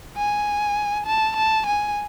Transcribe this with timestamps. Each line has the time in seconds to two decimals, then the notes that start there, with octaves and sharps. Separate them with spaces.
0.17 G#5
1.07 A5
1.37 A5
1.66 G#5